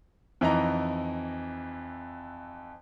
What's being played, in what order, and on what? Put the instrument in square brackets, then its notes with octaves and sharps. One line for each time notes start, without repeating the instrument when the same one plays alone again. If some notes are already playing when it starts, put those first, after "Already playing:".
[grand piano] F2 E3 D#4 D#5 A#5